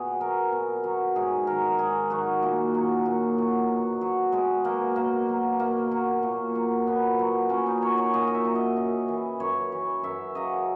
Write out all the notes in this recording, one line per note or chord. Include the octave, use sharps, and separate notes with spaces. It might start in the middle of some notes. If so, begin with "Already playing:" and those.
Already playing: B2 G#4
F#3 A#4
B2
F#3
G#2 G#4
D#3 F#3 A#4
G#2 G#4
D#3 F#3 F#4
A#2 A#3
F#3
A#2
F#3
B2
F#3
B2 G#3
F#3 A#3
B2 A#3
F#3
B2 A#3
F#3
A#2
F#3
A#2 B3
F#3
A#2 C#4
D#4
F#3 C#5
C#5
A#2 D#5
D#5
E5
F#3
D#5
F#2
E3
F#2 C#5
E3
F#2 E5
C#3 F#3 D#5